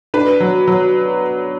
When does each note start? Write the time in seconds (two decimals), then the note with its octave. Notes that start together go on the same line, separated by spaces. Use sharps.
0.14 D4 B4
0.40 F#3
0.68 F#3